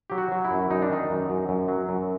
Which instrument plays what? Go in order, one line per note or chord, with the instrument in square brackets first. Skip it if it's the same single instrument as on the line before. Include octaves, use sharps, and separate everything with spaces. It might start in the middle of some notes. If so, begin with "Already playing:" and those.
[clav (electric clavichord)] F#3 G4
F#4
F#3
E4
F#2
F#2 D#4
D4
D#3 D#4
F#2
F#2
F#2
F#3
F#2